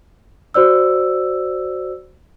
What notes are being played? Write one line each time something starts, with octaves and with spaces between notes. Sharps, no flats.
F#4 C5 D5 E6